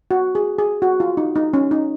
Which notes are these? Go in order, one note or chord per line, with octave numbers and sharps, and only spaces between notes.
F#4
G#4
G#4
F#4
F4
D#4
D#4
C#4
D#4